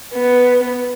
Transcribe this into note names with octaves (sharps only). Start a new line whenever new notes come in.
B3